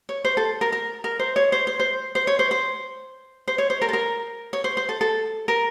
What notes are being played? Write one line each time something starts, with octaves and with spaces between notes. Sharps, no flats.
C#5
C5
A4
A#4
A#4
A#4
C5
C#5
C5
C5
C5
C5
C#5
C5
C5
C5
C#5
C5
A#4
A4
A#4
C#5
C5
C5
A4
A4
A#4